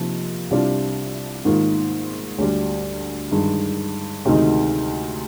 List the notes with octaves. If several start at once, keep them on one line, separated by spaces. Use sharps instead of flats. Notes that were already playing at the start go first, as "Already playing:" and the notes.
Already playing: C3 F3 A#3 D#4
C2 C3 G3 D4 F4
G#2 D#3 A#3 F4
D2 D3 G3
G2 D#3 G#3
D2 C3 D#3 G#3 D#4